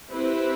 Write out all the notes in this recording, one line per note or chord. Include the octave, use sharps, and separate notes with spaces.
C4 E4 G4 B4